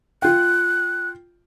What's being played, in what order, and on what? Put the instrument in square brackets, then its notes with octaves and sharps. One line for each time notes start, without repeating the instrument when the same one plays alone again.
[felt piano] F4 G5 [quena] F#6